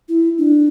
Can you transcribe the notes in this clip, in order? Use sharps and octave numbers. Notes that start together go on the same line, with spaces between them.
E4
D4